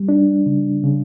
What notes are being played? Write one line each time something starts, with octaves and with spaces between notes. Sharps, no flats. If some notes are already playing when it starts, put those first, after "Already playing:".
Already playing: G3
D4
C#3
C#3